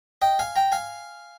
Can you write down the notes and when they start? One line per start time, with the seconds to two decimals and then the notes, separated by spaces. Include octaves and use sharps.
0.22 D#5 G5
0.39 F5 G#5
0.56 G5 A#5
0.72 F5 G#5